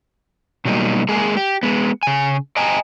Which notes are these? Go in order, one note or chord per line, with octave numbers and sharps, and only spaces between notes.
B2 F#3 G3 A#3 D#4
G#3 A#3 G#4
G4
G#3 B3
C#3 G#5
D#5 G5 G#5 A#5